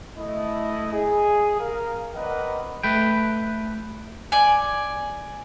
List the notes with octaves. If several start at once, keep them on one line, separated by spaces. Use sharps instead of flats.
A3 E4 D#5
G#4
A#4 F5
C4 A#4 B4 D5 D#5 F#5
A3 B4 G5
D5 G#5